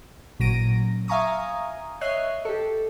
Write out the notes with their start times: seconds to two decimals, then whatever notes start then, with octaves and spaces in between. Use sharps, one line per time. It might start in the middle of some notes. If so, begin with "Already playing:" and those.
0.39 A1 A#2 F#3 A#6 D7 D#7
1.08 E5 F5 G#5 A#5 C#6 D#6
2.01 C#5 D#5 E5 F#6 C7
2.45 G4 A4